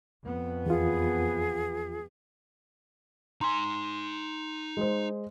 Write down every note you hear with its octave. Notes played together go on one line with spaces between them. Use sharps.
F2 B3
E2 F4 G#4
D#4 G#5 A#5 C6
G#3 C5